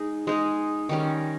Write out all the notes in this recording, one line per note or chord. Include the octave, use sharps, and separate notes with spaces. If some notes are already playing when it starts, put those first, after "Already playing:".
Already playing: G#3 D#4 G#4
G#3 D#4 G#4
D#3 G3 C#4